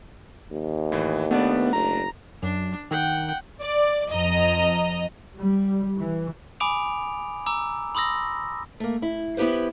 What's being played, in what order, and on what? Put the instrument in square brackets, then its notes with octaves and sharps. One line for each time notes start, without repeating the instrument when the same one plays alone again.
[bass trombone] D#2
[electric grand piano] A2 E3
[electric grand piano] A3 D4 D5 [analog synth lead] B3
[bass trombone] F#1 [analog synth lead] A#5
[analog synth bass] F#2 [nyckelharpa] D4
[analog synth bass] D#3 [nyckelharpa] F#5 G5
[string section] D5
F2 D#5 A#5
[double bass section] G3
E3
[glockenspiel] G#5 B5 D6 D#6 D7 F7
A#5 D6 E6
B5 C6 D#6 E6 A#6
[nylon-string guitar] A3 A#3
E4
B3 E4 G4 B4 C5